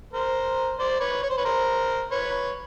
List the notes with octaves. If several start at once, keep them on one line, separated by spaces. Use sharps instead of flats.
A#4 C5
C5 D5
B4 C#5
C#5
C5
B4 C#5
A#4 C5
B4 C#5